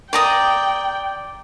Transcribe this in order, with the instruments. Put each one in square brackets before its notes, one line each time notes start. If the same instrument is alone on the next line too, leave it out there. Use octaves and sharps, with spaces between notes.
[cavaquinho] D5 A#5 D#6 [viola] G5